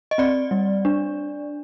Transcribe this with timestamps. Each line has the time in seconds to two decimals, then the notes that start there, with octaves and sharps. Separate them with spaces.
0.11 D#5
0.18 C4 D5
0.51 G3
0.85 D4